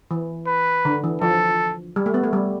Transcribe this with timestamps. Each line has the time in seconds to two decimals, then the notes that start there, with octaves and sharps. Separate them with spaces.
0.11 E3
0.47 B4
0.85 D3
1.04 E3
1.22 F3 A4
1.96 G3
2.06 A3
2.14 B3
2.23 A3
2.33 G3